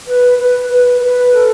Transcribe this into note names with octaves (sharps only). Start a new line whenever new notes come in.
B4
B4
B4
B4
A4